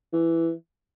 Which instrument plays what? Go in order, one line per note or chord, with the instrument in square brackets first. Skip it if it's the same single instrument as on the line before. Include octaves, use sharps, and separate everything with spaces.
[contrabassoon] E3